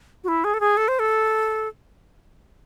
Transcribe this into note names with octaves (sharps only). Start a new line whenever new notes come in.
F#4
E4
G#4
A4
G#4
A4
C5
A4